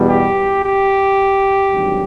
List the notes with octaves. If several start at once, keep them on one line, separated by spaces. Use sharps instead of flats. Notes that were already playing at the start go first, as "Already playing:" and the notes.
Already playing: E2 B2 G3
G4
G4
G#1 G2 D3 F#3